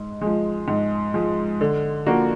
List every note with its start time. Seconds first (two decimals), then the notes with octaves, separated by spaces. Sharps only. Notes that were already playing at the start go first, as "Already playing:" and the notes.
Already playing: G#2
0.22 F3 G#3
0.68 G#2
1.14 F3 G#3
1.61 D3
2.06 F3 A#3 D4 F#4